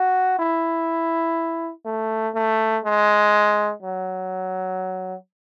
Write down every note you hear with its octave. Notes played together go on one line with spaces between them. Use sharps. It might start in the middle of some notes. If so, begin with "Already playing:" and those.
Already playing: F#4
E4
A3
A3
G#3
F#3